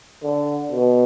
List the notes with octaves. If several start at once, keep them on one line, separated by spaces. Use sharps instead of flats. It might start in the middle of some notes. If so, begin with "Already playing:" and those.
D3
B2